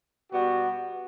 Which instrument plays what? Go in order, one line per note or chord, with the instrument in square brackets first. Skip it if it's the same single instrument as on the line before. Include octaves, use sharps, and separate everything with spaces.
[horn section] B2 G3 B3 F#4